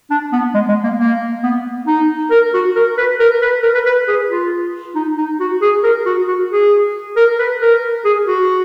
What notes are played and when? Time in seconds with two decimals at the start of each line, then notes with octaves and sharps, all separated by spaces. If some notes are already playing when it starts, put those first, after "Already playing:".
0.10 D4
0.32 B3
0.54 G#3
0.69 G#3
0.84 A#3
0.99 A#3
1.44 B3
1.87 D#4
2.31 A#4
2.54 F#4
2.76 A#4
2.98 B4
3.20 A#4
3.42 B4
3.63 A#4
3.75 B4
3.86 B4
4.08 G#4
4.30 F4
4.95 D#4
5.18 D#4
5.40 F#4
5.62 G#4
5.84 A#4
6.06 F#4
6.28 F#4
6.51 G#4
7.17 A#4
7.39 B4
7.61 A#4
8.05 G#4
8.27 F#4